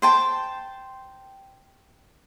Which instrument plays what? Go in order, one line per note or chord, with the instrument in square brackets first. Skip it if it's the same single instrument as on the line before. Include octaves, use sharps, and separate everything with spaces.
[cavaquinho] C5 G5 A5